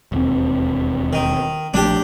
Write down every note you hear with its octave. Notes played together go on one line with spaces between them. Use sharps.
E1 D#2 C4
D#3
A#1 F3 A3 D4 G4